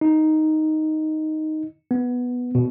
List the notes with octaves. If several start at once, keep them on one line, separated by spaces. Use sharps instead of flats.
D#4
B3
B2